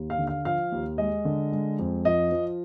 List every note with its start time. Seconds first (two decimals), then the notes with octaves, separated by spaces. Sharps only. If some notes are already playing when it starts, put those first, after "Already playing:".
Already playing: D#2
0.10 F5
0.19 D3
0.27 F5
0.45 F3 F5
0.72 D#2
0.98 G#3 D#5
1.25 D3
1.52 G#3
1.79 F2
2.05 F3 D#5
2.32 F3